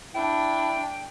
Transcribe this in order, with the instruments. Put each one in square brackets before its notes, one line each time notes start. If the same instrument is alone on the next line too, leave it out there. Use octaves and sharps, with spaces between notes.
[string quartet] D4 [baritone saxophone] E4 [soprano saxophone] G5